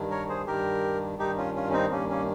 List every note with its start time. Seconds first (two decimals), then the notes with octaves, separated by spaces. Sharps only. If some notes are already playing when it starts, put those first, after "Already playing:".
Already playing: G2 D#3
0.10 A#4 C#5
0.29 G#4 C5
0.46 G2 D#3 G4 A#4
1.19 G2 D#3 D#4 G4
1.37 C#4 F4
1.55 C#4 F4
1.70 C#4
1.73 C4 D#4
1.91 G2 D#3 A#3 C#4
2.10 A#3 C#4